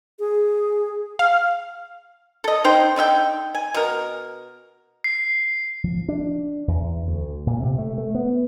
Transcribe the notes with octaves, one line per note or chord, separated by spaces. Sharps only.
G#4
F5
A4 D#5
D#4 C5 G5
D3 D#4 E5 G5
G#5
B2 A#4
C7
F3
D4
E2
D2
A#2
C3
A3
A3
B3